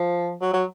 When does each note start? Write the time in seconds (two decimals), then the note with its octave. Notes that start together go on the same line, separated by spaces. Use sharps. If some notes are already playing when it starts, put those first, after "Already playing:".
Already playing: F3
0.41 F#3
0.54 F#3